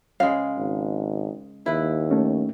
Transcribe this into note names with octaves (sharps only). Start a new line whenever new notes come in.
C#3 G#3 F5
G#1
D#2 E4 B4
A3 C#4